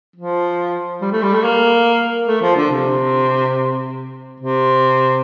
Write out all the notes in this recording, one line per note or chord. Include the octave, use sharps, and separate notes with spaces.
F3
G3
A3
G3
A3
A#3
A3
F3
D3
C3
C3